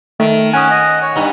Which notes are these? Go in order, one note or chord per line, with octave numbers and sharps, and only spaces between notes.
D#3 A3
C#4 F#5 G#5 D#6
D#5
C#5
G2 B3 D#4